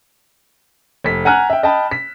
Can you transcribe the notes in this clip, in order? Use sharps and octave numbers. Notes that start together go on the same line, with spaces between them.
F1 B6
F#5 G#5 A#5 F6 F#6
E5 G5
D#5 G5 A5 B5
B6